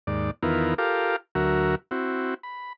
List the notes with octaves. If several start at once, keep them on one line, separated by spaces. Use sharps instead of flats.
D#2 G#2 D5
E2 D#3 B3 E4 F4 A#4
F4 G4 A4 A#4 F5 D6
D2 F#3 F#4 A#4 E5
C4 E4 F#4
B5